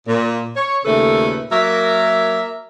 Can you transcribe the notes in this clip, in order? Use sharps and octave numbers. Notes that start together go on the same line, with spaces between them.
A#2
C#5
D#2 A#2 C#3 A3 A4 B4
F#3 A#3 A#4 E5